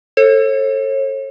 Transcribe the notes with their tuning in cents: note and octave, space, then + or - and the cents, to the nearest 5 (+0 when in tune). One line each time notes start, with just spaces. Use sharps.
A4 +15 C#5 -40